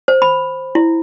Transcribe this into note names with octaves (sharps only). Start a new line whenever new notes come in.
C5
B5
E4